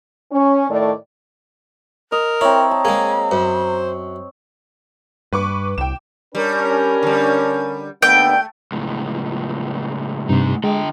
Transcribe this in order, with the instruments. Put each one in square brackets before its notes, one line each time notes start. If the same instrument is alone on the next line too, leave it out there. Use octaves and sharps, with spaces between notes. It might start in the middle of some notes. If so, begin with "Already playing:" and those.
[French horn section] C#4
A2 D#3 A3 D5
[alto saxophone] A#4 [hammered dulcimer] D#5
[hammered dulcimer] C4 C#5 [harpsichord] E4 [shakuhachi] A#5
[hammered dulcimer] A5
[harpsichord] G#3 A#3 [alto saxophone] G#4
[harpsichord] F#2 [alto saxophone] C5
[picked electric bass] G2 [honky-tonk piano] B4 C#6 D6
[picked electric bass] C2 [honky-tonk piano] G5 E7
[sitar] G3 [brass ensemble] C#4 D4 A#4
[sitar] D3 G3
[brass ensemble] D#2 B3 D4 [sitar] A3 [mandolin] G5
[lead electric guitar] C#2 A2
[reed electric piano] G2 C3 [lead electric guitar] A3 D#4
[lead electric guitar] D3 G5 [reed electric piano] G#3